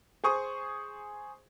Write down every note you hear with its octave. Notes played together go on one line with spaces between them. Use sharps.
G#4 C5 C#6 D#6